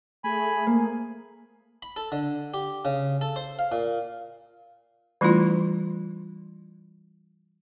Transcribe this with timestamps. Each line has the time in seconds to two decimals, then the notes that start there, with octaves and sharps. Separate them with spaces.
0.24 A3 G#4 G#5 B5
0.67 A#3
1.82 B5
1.96 A4
2.12 D3
2.54 G4
2.85 C#3
3.21 A4
3.36 C5
3.59 F5
3.72 A#2
5.21 E3 G3 A3 D4 E4 F4